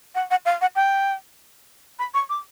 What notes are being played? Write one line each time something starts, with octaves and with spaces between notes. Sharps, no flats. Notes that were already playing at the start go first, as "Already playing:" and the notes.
F#5
F#5
F5
F#5
G5
B5
C#6
D6